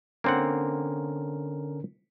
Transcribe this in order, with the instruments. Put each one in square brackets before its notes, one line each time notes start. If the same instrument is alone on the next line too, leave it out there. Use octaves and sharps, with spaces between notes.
[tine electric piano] D3 C#4 A#4 [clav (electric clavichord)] A#3 C4 F#5